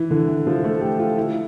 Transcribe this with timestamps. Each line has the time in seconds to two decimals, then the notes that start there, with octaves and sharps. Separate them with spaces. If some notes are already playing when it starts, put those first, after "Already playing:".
Already playing: E3
0.11 D3
0.28 E3
0.47 F3
0.64 A3
0.81 G4
0.99 F4
1.17 E4